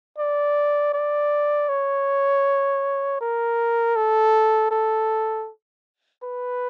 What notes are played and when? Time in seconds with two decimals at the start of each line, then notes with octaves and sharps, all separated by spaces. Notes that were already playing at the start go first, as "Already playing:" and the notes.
0.19 D5
0.94 D5
1.69 C#5
3.21 A#4
3.96 A4
4.71 A4
6.23 B4